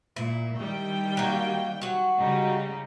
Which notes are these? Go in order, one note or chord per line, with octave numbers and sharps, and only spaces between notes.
A#2 E4
D#3 G3 G5
F#3 A#3
F#3 F#4
C#3 G3 D#4